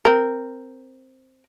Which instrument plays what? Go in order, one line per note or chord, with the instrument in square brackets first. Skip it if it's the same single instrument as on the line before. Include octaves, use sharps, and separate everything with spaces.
[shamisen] C4 A#4